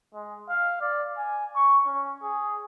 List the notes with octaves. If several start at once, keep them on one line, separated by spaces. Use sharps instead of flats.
G#3
F5
D5
G#5
C#6
C#4
G#4